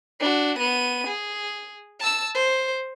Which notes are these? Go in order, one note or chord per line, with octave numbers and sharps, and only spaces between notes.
D4 F#4
B3 D#7
G#4
A5 E6
C5